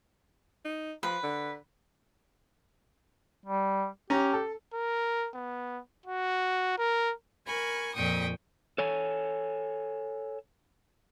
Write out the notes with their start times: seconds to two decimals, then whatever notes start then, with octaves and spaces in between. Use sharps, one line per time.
0.65 D#4
1.03 F3 B4
1.23 D3
3.45 G3
4.10 C#4 G4 A#5
4.33 A4
4.74 A#4
5.35 B3
6.06 F#4
6.78 A#4
7.45 A#4 G#5 B5 C#6
7.93 F2 A#2 G5 C#6 D#6
8.78 A4 C#5 G#5